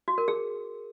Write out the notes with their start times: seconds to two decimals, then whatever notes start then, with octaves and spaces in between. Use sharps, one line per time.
0.08 F#4
0.18 A#4
0.28 G#4